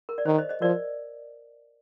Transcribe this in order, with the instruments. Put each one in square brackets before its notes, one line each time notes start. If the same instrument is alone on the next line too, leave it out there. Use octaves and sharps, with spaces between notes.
[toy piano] A#4
D5
[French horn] D#3 [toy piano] C5
[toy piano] C5 D#5
C5 D#5
[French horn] F3 [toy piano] A#4 D5